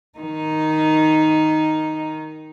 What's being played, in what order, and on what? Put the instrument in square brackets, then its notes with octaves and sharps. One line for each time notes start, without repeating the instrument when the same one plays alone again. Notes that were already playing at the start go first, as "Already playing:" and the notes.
[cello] D#3 D#4